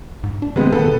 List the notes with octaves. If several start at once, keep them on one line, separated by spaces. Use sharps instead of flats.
G#2
D4
C3 D#3 G#3 B3
D#3 B3 A4
B2